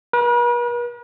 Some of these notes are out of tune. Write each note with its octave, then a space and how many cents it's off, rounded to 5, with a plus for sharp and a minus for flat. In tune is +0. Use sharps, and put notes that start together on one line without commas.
B4 -45